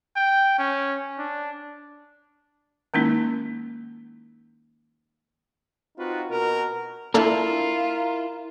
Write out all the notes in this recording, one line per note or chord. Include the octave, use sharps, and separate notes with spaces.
G5
C#4
D4
D#3 G#3 A#3 C#4 D#4 E4
C4 D#4 F4 F#4 B4
B2 F#4 A#4
A#3 D4 E4 F4 A4 A#4